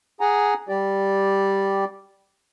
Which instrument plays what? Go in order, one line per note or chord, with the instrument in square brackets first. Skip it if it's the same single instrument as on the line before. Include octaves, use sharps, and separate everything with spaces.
[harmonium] G#4 F#5 G#5 A#5
G3 G4 D5